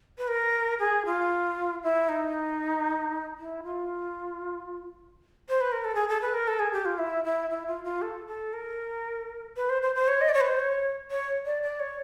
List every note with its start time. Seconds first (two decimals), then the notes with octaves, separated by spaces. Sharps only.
0.18 B4
0.27 A#4
0.79 G#4
1.05 F4
1.83 E4
2.08 D#4
3.38 E4
3.63 F4
5.49 C5
5.61 B4
5.72 A#4
5.84 A4
5.95 G#4
6.08 A4
6.21 B4
6.34 A#4
6.47 A4
6.59 G#4
6.72 G4
6.85 F4
6.98 E4
7.24 E4
7.50 E4
7.67 F4
7.84 F4
8.01 A4
8.27 A4
8.53 A#4
9.56 B4
9.69 C5
9.82 C5
9.95 C5
10.08 C#5
10.21 D#5
10.29 D5
10.33 C#5
10.41 B4
10.46 C5
10.59 C#5
11.11 C#5
11.45 D5
11.62 D5
11.79 C#5